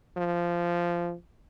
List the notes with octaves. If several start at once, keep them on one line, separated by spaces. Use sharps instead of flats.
F3